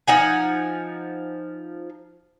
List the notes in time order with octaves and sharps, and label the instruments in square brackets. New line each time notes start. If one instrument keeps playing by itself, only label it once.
[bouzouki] F3 D#4 F#5 G#5